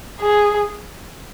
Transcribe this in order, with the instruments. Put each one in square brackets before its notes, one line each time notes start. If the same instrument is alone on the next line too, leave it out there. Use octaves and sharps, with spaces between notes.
[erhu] G#4